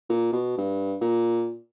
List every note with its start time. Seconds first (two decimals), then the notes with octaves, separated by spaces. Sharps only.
0.09 A#2
0.32 B2
0.58 G2
1.01 A#2